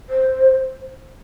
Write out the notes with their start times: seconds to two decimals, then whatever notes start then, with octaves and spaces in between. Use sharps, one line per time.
0.09 C5